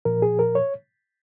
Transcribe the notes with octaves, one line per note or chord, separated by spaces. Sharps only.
A#2 F3 A#4
G#4
A#4
C#5